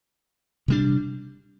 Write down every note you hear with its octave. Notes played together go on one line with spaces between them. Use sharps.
C3 G3 D4